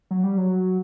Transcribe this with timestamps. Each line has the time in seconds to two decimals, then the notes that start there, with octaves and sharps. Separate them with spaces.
0.11 F#3
0.24 G3
0.38 F#3